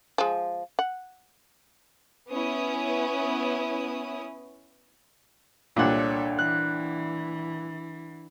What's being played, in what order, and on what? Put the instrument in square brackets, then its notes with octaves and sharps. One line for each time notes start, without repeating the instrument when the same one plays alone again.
[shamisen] F3 G#3
F#5
[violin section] B3 C#4 E4 D#6
[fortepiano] C2 A#2 [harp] D4 F#5 [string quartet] A4 C#5
[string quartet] E3 [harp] F#6